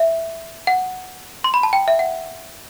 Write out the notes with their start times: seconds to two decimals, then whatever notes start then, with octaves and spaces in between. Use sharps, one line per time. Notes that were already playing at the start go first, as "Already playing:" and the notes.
Already playing: E5
0.67 F#5
1.44 C6
1.54 B5
1.63 A5
1.73 G5
1.88 E5
1.99 F#5